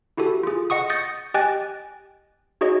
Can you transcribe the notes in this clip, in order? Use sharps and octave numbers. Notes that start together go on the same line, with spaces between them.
E4 F#4 G4 A4
F4 G#4
D#5 F#5 C#6 D#6
D#6 G6 A6 A#6 C#7
G4 D#5 G5 G#5 F#6 A6
D#4 F#4 G#4 C#5 D#5